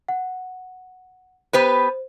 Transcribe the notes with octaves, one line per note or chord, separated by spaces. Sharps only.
F#5
B3 G4 B4 C5